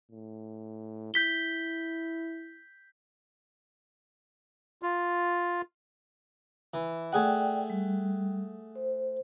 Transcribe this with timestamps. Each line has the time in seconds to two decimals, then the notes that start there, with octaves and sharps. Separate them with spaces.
0.11 A2
1.14 E4 G6 B6 G7
4.82 F4
6.74 E3
7.13 A3 G#4 D5 F#5 G5
7.70 G3
8.75 C5